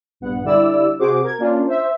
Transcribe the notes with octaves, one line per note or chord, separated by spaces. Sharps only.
A#1 G2 B3 F#5
D3 G3 E4 D5 E6
C3 F#4 G#4 C5 D6
A#4 G#6
A#3 C#4 D4 F4
C5 E5